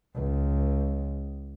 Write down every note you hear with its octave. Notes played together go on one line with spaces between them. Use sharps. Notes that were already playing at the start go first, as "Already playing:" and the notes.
C#2